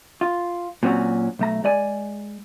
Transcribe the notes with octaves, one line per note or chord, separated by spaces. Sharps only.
F4
A#2 F#3 C4 C#4 F#4
B1 A3 A#5
G#3 D5 G#5